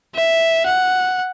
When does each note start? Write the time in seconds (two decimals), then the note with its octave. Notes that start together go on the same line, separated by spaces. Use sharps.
0.15 E5
0.66 F#5